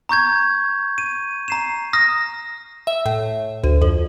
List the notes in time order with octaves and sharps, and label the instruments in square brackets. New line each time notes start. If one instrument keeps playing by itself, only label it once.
[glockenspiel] A#5 C#6 G6 G#6
D#7
A#5 C7 E7
D#6 F6 A#6
[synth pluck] E5
A2
D2
F2